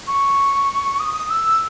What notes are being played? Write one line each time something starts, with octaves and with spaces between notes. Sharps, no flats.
C#6
D#6
E6